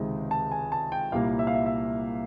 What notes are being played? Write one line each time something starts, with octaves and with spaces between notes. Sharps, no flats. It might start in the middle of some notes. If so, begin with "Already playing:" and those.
Already playing: C#2 C3 D#3 G#3
A5
G#5
A5
G5
C2 A#2 G3 A#3 F5
E5
F5
E5
E5